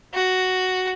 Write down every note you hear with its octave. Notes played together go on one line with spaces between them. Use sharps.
F#4